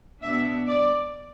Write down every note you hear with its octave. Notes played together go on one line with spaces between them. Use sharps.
B2 B3 D4 E5
D5